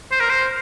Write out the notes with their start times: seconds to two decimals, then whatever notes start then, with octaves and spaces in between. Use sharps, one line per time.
0.12 C5
0.20 A#4
0.30 C5